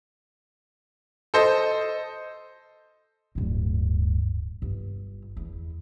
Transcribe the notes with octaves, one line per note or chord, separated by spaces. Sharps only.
A4 C5 D#5
D1 G2
G1
E2